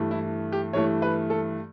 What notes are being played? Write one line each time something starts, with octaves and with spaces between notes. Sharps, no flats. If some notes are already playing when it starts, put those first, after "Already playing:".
Already playing: G2 E3 A3
E4
G4
G2 E3 A3 C#5
B4
A4